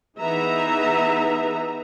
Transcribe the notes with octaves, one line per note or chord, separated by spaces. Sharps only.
E3 B3 D#4 G#4 E5 A#5